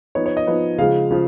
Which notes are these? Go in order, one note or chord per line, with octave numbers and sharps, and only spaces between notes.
F3 B3 D#4 C#5
C#5
D#5
F3 B3 D#4
C#3 F3 G#3 F5
C#3 F3